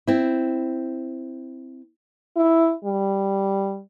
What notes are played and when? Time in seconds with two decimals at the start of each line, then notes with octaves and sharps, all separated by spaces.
0.07 C4 E4
2.36 E4
2.85 G3